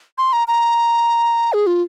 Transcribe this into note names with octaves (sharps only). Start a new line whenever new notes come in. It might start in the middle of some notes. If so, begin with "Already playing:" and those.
C6
A#5
A#5
G#4
F4